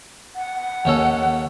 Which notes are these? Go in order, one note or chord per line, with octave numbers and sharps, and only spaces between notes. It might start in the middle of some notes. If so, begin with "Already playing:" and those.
F#5
D#2 C#4 A4